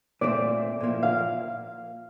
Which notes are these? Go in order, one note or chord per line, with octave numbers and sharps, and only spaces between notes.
A#2 A3 C4 D5
A#2 F3 A#3 E4
F5